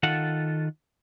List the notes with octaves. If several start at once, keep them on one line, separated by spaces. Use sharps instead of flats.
D#3 F4 A4 F#5